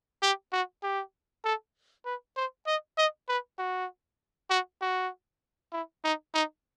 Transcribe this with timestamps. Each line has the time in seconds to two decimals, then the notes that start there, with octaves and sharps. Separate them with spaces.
0.23 G4
0.53 F#4
0.83 G4
1.45 A4
2.05 B4
2.36 C5
2.67 D#5
2.98 D#5
3.28 B4
3.58 F#4
4.50 F#4
4.81 F#4
5.72 E4
6.04 D#4
6.34 D#4